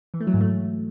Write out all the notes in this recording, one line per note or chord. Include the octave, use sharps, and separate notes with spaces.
E3
A3
F#3
G#2
A3